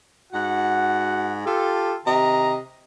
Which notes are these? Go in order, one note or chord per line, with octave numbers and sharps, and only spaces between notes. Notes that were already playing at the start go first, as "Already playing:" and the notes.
G#2 F#4 F#5
F4 G4 A4
C3 D#3 D#5 A#5